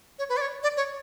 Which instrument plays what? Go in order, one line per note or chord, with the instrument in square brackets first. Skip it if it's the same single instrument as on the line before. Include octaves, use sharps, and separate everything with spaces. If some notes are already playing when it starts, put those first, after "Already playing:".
[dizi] C#5
B4
D5
C#5
D5
C#5